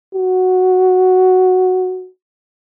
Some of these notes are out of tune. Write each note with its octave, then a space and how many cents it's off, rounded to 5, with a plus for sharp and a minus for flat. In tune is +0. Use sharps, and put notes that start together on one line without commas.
F#4 +0